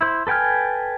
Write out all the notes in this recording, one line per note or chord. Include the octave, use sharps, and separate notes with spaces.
E4 C5
A4 B4 G5 G#5 F6